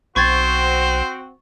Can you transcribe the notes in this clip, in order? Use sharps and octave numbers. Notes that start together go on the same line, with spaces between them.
B1 C4 F#4 C5 C#6 G#6 A6